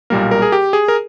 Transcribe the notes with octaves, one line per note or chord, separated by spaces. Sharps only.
B1 A#2 G3 A#3 A#4
A#4
G#4
G4
G#4
A#4